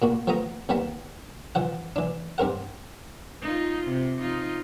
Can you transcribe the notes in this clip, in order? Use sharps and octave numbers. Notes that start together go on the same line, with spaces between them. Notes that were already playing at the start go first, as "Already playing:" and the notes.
A#2 A#3 F#4
F3 A3 B3 A#5 D#6
D#2 G3 A#3 B3 A5 B5
E3 F3 F#5
E3 D4
G2 C4 A#4 F#5
D#4 F4
C3
F3 D#4 F4